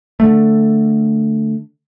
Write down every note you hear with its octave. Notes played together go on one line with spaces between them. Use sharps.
D3 A3